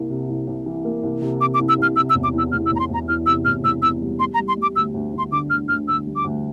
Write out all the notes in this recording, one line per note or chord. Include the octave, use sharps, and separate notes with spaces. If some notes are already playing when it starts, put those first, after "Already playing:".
Already playing: C2 A#3
C3
C2
C2
E3
A#3
C2
C3
C3 D6
D6
C2
E6
C2 F6
C3 E6
E6
E1
D6
E2 E6
E1 F6
E6
E1 A#5
C6
E1 A#5
E2 F6
C3 E6
E1 F6
E1 E6
E2 E6
G3
G3 C6
A#5
G3
C6
G3
D6
D2 E6
D2
D2
C6
D3 D6
D2 F6
D2 F6
D2 E6
G3
D6
D2